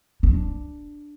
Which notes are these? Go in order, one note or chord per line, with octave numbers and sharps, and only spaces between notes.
D4